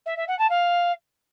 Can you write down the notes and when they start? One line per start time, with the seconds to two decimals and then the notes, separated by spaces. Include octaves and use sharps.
0.06 E5
0.17 E5
0.28 F#5
0.39 A5
0.50 F5